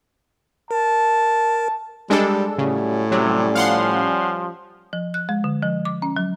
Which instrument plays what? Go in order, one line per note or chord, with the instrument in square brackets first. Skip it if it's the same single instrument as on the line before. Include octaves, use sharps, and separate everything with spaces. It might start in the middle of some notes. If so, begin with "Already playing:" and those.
[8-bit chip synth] A#4 [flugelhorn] A5
[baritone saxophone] G3 [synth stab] G#3 D4 A4
[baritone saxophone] A2 [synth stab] C#3 [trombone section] F#3 G3 C#4
[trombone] C3 [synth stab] F#3 [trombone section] G3 C#4
[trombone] F3 [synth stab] F5 F#5 C6
[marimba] F3
F#6
G#3
D3
F3
D6
C#4
F#3